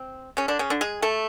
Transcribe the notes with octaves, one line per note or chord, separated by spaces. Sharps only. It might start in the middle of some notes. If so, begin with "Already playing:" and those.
Already playing: C4
C#3 C#4
D3 D4
C#3 C#4
D3 D4
G#3 G#4
A3 A4